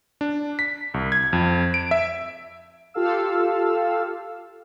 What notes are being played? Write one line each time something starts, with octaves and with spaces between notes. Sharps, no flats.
D4
B6
C2
G#6
F2
D7
E5
F4 G4 A4 F5 E6